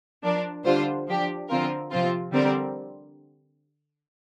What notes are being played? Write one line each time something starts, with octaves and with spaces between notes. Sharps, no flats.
F3 D4 A#4 D5
D3 G3 D4 F4 C5
F3 D4 G4
D3 F3 C4 F4 A#4
C3 F3 C4 F4
D3 G3 C4 A#4 D5